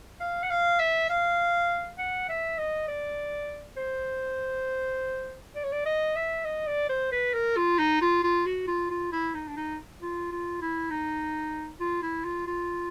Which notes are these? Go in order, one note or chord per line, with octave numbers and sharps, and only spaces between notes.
F5
F#5
F5
E5
F5
F#5
E5
D#5
D5
C5
D5
C#5
D5
D#5
E5
D#5
D5
C5
B4
A#4
F4
D#4
F4
F4
F#4
F4
F4
E4
D#4
D4
D#4
F4
F4
E4
D#4
F4
E4
F4
F4